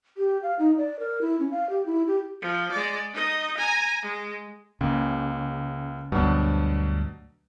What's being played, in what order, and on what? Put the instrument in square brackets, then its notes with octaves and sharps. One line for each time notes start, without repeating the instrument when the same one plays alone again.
[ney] G4
F5
D#4
D5
A#4
E4
C#4
F5
G4
E4
G4
[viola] F3
G#3 D5
D#4 D#5
G#5 A#5
G#3
[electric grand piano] C#2 A#3 [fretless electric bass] C#3
[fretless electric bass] D2 G2 [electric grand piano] B2 F#3 D4